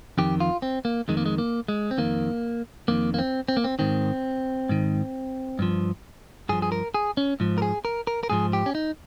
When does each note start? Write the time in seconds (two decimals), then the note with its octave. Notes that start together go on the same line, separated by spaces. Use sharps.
0.18 F2 D#3 G4
0.40 F4
0.62 C4
0.85 A#3
1.08 F2 D#3 G#3
1.17 A#3
1.26 G#3
1.38 A#3
1.68 G#3
1.91 C4
1.98 F2 D#3 A#3
2.88 F2 D#3 A#3
3.14 A#3
3.19 C4
3.48 C4
3.57 A#3
3.64 C4
3.79 G#2 D#3 C4
4.69 G#2 D#3
5.59 G2 F3
6.49 G2 F3 G#4
6.62 G#4
6.72 A#4
6.94 G#4
7.17 C#4
7.40 G#2 F3
7.58 A#4
7.62 G#4
7.85 A#4
8.07 A#4
8.23 A#4
8.30 G#2 F3 G#4
8.53 G4
8.66 C#4
8.75 D#4